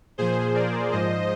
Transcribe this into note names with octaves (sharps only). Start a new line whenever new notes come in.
A#2 F3 G#4 C5
A#4 D5
G#2 F3 C5 D#5